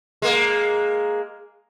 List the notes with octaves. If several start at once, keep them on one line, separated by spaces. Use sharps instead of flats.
G#3 A#3